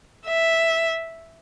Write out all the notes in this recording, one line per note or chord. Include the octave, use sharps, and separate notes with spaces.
E5